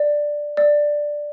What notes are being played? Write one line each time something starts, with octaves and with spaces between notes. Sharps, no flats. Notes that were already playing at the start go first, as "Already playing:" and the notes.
Already playing: D5
D5